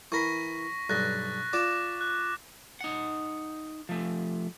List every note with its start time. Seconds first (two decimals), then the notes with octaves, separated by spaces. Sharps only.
0.12 E3 A#4 B5 C#6 A#6 B6
0.90 B1 G2 F#6 A6 A#6
1.53 F4 D5 D6 E7
2.01 F#6
2.81 D#4 F#5
3.89 F3 A3